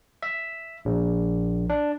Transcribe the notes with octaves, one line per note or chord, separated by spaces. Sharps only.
E5
A#1
D4